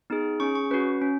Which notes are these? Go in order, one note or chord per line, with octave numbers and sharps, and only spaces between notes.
B3 D#4 G#4
C#4 G#4 C#6
C#6
C#4 F#4 B4
C#4